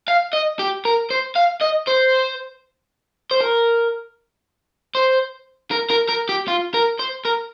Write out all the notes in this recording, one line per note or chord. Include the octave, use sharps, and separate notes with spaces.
F5
D#5
G4
A#4
C5
F5
D#5
C5
C5
A#4
C5
A#4
A#4
A#4
G4
F4
A#4
C5
A#4